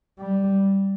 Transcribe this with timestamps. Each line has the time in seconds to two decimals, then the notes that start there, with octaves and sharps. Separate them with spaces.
0.19 G3